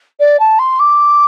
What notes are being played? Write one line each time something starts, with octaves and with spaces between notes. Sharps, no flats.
D5
A5
C6
D6